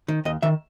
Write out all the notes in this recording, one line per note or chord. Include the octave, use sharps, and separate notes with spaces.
D#3
D#2 D#5
D#3 E5